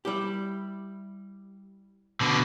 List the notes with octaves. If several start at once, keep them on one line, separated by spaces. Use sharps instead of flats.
G3 E4 G4
B2 D3